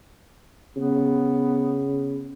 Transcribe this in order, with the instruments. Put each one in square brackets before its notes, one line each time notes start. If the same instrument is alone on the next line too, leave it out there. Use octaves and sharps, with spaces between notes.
[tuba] C#3 [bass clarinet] B3